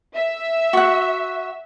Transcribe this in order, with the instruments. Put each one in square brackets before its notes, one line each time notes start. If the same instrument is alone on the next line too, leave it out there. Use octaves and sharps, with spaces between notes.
[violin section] E5
[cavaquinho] F#4 F#5